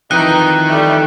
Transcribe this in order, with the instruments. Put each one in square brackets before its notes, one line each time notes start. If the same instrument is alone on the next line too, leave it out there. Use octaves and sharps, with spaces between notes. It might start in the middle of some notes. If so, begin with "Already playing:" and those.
[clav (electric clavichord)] F2 E3 [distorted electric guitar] D#3 G5 [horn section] D#4 [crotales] F#6
[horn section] G3 A3